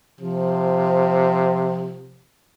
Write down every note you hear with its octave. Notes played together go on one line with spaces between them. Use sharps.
C3 F3